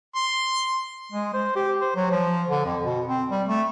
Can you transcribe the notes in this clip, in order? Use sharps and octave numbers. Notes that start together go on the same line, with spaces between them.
C6
G#3
C5
G4
C5
F#3
F3
D3
F2
B2
C4
G3
A3